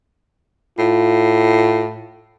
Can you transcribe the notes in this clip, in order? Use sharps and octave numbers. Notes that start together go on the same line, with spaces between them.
A2 F4